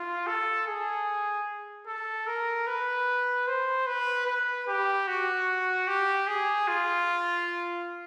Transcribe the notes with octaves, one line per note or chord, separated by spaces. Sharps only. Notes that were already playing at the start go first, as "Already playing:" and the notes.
Already playing: F4
A4
G#4
A4
A#4
B4
C5
B4
B4
G4
F#4
G4
G#4
F4